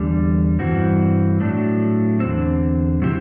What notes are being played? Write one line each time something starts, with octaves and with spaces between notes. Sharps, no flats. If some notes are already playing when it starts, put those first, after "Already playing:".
Already playing: E2 D3 G3
G2 E3 C4 F#4
A2 F#3 A3 D4
E2 D3 G3 C4
C3 F#3 C4 E4 G4